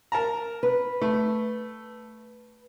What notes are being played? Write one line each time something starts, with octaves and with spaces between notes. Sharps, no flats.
A#4 A5 A#5
B4
A3